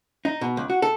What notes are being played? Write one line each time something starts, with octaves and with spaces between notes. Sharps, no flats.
D#4
B2
C#2
F#4
A4